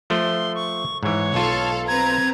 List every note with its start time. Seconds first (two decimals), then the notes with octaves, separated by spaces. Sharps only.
0.10 F3 A3 C6
0.55 C#6
1.03 G#2 E3 C#5
1.34 B1 F4 A4 F5
1.88 C4 B4 A#5 G#6